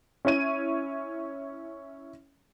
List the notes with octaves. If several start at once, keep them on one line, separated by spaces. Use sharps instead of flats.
C#4 E4 C#5 D#7